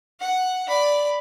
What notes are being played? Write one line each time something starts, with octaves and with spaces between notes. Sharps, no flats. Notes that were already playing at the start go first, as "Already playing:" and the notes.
F#5
D5 B5